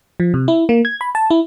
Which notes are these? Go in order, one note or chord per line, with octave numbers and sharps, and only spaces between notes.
F3
C3
E4
A#3
G#6
B5
A5
E4